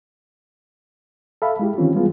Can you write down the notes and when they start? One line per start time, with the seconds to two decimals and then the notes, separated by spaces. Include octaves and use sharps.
1.42 A4 E5 F5 B5
1.59 G#3 E4 G4
1.77 D#3 E3 C4 C#4 F4
1.94 G3 G#3 B3 F4 G#4